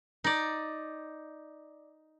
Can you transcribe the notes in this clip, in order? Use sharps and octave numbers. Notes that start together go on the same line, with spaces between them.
D#4 D5